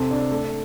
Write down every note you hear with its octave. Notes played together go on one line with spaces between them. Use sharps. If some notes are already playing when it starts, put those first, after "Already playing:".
Already playing: C3 C4 A4
D4
A3